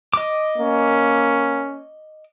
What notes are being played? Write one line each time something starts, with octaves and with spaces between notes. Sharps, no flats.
D#5 D6
A#3 C#4